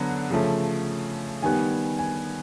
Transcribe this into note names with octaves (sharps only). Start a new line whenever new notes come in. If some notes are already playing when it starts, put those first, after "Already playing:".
Already playing: D3 F#3 B3 A#5
C#3 F3 A3
D#3 G3 B3 G#5
G#5